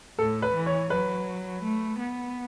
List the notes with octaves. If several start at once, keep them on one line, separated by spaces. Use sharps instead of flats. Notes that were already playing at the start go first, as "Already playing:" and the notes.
A2 A4
B4
E3
C#5
F#3 B4
A3
B3